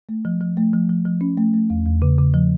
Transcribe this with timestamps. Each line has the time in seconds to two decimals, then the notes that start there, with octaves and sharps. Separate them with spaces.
0.09 A3
0.25 F3
0.41 F3
0.57 A3
0.73 F3
0.89 F3
1.05 F3
1.21 C#4
1.37 A3
1.54 A3
1.70 E2
1.86 E2
2.02 C#3
2.18 C#3
2.34 F3